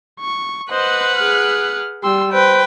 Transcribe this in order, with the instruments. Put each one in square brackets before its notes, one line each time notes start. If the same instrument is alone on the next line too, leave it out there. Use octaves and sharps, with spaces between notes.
[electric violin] C#6
[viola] B4 F#5 [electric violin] C5 D#5
[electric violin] G#4 F6
[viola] G3 [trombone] G4 [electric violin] C6 E6
[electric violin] B4 [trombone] C5 [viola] G5